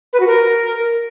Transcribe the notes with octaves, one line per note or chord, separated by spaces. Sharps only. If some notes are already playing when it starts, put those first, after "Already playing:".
B4
F#4
A#4